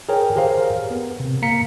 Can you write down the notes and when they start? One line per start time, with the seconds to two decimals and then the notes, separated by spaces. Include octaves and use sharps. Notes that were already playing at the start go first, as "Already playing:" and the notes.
0.09 G#4 A#4 C#5 G5
0.36 G4 G#4 A#4 C5 F5
0.91 B3
1.20 C3
1.42 A#3 F5 A#5 B6 C#7